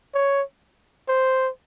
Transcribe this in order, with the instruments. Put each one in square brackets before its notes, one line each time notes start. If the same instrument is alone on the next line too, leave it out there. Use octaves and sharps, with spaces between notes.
[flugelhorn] C#5
C5